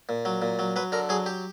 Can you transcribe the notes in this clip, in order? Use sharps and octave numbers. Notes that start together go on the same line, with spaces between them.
A#2
F#3
A#2
F#3
F#3 B4
D3 A#4
F#3 G#4
G4